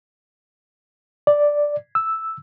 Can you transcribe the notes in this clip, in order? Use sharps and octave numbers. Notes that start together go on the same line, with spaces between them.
D5
E6